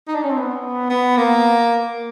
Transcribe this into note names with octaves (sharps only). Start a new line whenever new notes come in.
D#4
D4
C#4
C4
B3
B3
A#3